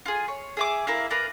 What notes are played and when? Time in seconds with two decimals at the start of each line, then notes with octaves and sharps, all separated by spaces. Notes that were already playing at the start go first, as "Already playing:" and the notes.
0.05 F4 G#4
0.28 C#5
0.57 G#4 E5 D6
0.87 A#3 E4 E5 F5
1.10 D4 A#4 B4